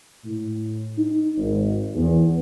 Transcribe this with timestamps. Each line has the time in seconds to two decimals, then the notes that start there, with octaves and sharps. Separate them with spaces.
0.25 A2
0.98 D#4
1.38 G#1
1.95 E2